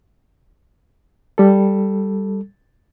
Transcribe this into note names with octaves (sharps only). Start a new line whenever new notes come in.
G3 A4